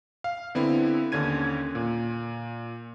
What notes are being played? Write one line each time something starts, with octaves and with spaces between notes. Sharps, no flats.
F5
D3 B3 C4 E4
D#2 D3 C#4 G#6 D#7
A#2